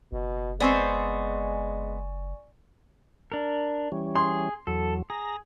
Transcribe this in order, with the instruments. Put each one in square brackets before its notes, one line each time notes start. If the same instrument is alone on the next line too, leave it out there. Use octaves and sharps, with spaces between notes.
[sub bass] F#1 [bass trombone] B2
[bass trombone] G#3 [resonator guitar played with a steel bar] B3 C4 C5 [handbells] D5 G#5 C#6
[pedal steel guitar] D4 A#4
[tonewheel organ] E3 G3 C#4
[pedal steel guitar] G#4 [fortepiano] C6
[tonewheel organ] E2 F#3 [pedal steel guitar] A4
[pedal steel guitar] G#4 [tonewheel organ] A#5